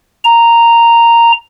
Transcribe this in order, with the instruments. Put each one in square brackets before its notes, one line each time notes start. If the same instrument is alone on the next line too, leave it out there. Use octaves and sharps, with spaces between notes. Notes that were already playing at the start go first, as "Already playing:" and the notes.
[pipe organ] A#5